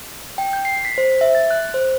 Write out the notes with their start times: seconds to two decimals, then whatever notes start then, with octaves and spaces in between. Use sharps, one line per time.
0.38 G5
0.53 G6
0.65 C7
0.85 B6
0.98 C5
1.21 E5
1.35 A6
1.51 F#6
1.74 C5